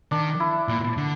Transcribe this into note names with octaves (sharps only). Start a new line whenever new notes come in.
D#3 D4
E4
A#2
D3